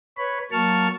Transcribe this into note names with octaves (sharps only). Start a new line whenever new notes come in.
B4 C#5 B5
F#3 A#3 A5 C#6 F6